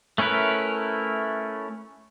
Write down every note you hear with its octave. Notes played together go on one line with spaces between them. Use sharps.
A3 C#4 E4 A#4 B4